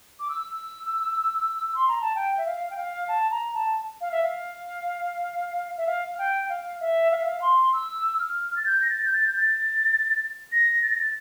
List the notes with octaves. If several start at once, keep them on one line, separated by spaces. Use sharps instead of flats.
D6
E6
C6
A#5
A5
G5
E5
F5
G5
F5
A5
A#5
A5
F5
E5
F5
E5
F5
G5
F5
E5
F5
E5
F5
C6
E6
F6
A6
G6
A#6
A6
G6
A6
G6
A6
A#6
A6
A#6
A6